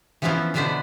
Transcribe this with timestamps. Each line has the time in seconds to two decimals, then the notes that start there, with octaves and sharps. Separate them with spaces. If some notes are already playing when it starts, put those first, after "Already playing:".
0.22 E3 F3 B3 C#4 E4 F4
0.54 B2 D3 B3 D4 B4 C5